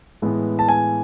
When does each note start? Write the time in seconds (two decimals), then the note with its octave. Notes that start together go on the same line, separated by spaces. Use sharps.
0.22 A2 E3 G#3 B3
0.59 A5
0.69 G#5